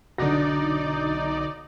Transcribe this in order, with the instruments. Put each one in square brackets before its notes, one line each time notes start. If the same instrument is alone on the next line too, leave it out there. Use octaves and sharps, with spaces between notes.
[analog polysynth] B1 D#4 D5 [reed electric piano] D3 F#4 [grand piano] D4 A#6